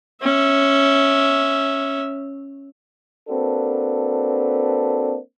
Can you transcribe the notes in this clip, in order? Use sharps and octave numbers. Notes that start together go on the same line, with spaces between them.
C#4 E5
A#3 C4 D4 F#4 A4 B4